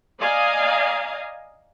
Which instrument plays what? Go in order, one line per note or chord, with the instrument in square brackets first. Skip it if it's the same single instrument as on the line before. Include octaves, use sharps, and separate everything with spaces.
[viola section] D5 D#5 F5 G#5 A#5